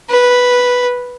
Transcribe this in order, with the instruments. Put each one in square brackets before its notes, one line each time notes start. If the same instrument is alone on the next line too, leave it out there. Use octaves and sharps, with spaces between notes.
[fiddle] B4